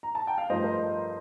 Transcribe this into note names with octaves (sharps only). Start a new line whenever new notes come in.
A#5
A5
G5
F5
G2 F3 A3 C5 D#5
A#4